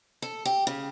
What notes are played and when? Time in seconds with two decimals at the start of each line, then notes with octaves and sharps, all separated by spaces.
0.22 A4
0.45 G4
0.67 C#3